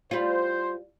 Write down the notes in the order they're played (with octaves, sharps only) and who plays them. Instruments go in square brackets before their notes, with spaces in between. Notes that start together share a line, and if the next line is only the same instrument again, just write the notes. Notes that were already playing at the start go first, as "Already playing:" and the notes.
[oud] G3 F4 [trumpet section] C5